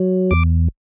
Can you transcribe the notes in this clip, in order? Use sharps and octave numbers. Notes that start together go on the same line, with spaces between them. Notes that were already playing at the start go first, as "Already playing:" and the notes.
Already playing: F#3
E2 D6